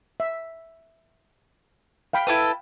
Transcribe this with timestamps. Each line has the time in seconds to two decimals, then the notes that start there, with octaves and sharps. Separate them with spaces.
0.20 E5
2.13 F5 G5 B5
2.27 E4 A4 B4 G5